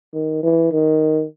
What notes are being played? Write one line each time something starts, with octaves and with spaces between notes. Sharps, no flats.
D#3
E3
D#3